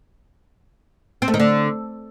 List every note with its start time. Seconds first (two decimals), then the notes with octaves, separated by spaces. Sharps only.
1.22 C4
1.28 A3
1.34 D#3
1.40 D3